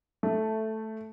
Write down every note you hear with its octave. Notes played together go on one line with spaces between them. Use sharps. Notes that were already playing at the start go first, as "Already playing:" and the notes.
A3